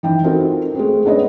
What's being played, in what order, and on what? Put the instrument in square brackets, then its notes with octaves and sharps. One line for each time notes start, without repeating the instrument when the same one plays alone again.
[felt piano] D#3 E3 G5
C4 D#4 F4 F#4 A4 A#4
G#3 A3 C4
G#3 B3 D4 B4 C#5 D#5